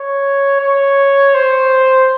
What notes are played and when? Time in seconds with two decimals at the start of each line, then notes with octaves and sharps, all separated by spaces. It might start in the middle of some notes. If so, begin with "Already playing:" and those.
Already playing: C#5
0.61 C#5
1.35 C5